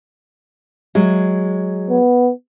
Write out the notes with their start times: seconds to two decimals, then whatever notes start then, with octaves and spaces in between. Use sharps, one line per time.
0.95 F#3 G#3
1.89 B3